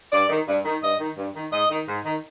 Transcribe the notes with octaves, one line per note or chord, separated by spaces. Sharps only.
G2 D5
D#3
G2
D#3
G2 D#5
D#3
G2
D#3
G#2 D#5
D#3
G#2
D#3